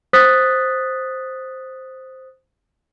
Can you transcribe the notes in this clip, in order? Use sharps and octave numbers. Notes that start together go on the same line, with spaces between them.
C5 D#6 F#6 A6 B6